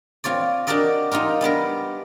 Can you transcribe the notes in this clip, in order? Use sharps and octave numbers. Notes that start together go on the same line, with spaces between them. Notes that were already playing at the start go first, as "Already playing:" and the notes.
C4 F4 C#5 D5
D4 F#4 G4 A#4 D5 D#5
D#4 F4 G4 A#4
G3 B3 D4 A#4